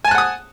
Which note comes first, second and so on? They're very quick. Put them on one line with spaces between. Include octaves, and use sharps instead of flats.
G#5 A5 F#6 F#5 D#6